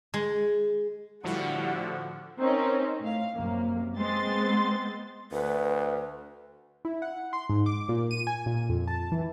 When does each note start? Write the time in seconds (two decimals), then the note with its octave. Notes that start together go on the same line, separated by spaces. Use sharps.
0.14 G#3
1.24 A2 D3 F3 G3 E4 F#4 F#5
2.38 C4 C#4 D#4 A#4
3.01 A2 F5
3.35 F#2 C3 A#3
3.97 G#3 B3 C4 C6 A6
5.32 D2 B4
6.85 E4
7.02 F#5
7.33 C6
7.49 G#2
7.66 D6
7.89 A#2
8.11 D#7
8.27 G#5
8.46 A#2
8.70 F2
8.88 A5
9.12 E3